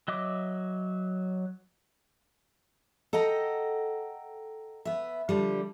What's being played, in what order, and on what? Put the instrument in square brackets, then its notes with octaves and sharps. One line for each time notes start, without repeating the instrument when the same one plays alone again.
[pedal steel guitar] F#3 D#5 E5 D6
[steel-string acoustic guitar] A4 D#5 F#5 G5 A#5
B3 E5
D3 F3 G3